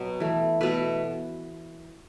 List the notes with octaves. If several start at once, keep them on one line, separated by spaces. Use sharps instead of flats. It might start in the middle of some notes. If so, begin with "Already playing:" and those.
Already playing: B2 F#3 B3
E3 A3
B2 A3 B4